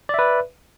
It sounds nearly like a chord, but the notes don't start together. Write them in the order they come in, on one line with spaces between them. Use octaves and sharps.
D5 E5 B4